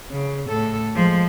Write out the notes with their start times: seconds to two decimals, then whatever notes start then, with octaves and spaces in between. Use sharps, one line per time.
0.11 C#3
0.49 A2 A4
0.95 F3 G#3